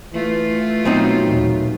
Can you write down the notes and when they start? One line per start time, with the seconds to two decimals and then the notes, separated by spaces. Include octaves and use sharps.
0.13 E3 A3 F4
0.85 B2 F#3 C4 D#4
1.22 D#2 A#2 E3